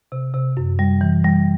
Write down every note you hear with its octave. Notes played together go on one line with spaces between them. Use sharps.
C3
C3
F#2
G3
E3
G3